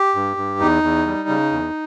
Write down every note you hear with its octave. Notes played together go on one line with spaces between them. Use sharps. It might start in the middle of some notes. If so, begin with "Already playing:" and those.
Already playing: G4
G2
G2
E2 D#4
E2
G3
C#3
E2